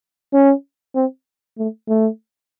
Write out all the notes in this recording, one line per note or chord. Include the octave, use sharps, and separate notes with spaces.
C#4
C4
A3
A3